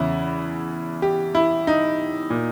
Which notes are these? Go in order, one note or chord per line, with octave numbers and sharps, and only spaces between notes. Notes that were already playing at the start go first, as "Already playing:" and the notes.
Already playing: E2 C#3 E3 E4
G4
E4
D#4
A#2